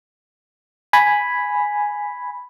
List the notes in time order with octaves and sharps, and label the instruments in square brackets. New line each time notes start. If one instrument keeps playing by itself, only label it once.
[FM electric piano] G#5 B5